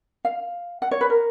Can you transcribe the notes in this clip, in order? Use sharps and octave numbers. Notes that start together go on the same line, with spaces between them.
F5
F#5
C#5
B4
A#4